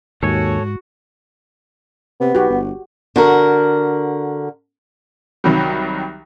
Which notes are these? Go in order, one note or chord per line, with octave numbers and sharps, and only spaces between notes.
D#2 G#2 F#4 A4 C#5 G#5
C3 B3
B1 F#4 G4
G1
D3 F#4 A#4
C2 D#3 F#3 G3